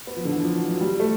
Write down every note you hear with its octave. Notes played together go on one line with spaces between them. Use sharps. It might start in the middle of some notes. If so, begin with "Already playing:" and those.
B3
F3
D3
E3
F3
F#3
F#3
G3
A3